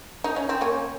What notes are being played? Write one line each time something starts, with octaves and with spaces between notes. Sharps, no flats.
D#4
C#4
C4
A#3 C#4